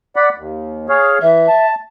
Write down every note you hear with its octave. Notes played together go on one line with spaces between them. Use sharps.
D5 F#5 B5
D#2
G#4 C#5 F5
E3 E5
A5